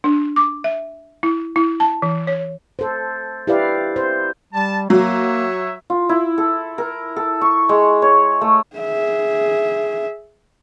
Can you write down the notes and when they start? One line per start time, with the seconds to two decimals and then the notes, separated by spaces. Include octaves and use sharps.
0.04 D4
0.36 D6
0.64 E5
1.23 E4
1.56 E4
1.80 A5
2.02 E3
2.27 C#5
2.79 A4 C5
3.47 E4 G4 B4 D5 F5
3.96 C5
4.53 G3 A5
4.90 F#3 A#3 C#5 E5
5.90 F4
6.09 E4
6.38 A4
6.78 A#4
7.16 A4
7.41 C#6
7.69 G#3
8.02 C#5
8.41 A3
8.76 G#4 E5